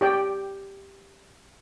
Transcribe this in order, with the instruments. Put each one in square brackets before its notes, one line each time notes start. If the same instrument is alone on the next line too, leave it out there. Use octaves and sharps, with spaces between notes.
[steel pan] G4 D5 G5